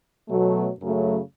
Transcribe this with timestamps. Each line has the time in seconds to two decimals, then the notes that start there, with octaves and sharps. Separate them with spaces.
0.29 B2 F#3 A3
0.79 F#2 C#3 F#3 A3